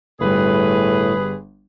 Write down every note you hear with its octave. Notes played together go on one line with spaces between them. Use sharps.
G1 A2 G3 G#4 B4